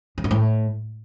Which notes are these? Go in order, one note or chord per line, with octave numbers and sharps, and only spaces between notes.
C#3
A#2
A2